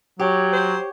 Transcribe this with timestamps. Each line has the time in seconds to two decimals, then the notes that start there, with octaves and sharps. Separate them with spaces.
0.19 F#3 G4 C#5
0.53 C5